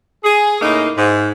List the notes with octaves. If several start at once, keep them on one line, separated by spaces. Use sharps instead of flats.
G#4
A2 C#3 A#3 D#4
G#2